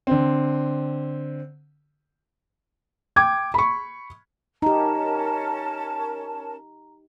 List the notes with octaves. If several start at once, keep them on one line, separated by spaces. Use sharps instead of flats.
D3 C4
G5 D6 G#6
B5 C#6
C#4 D#4 G4 A#4 A5 A#5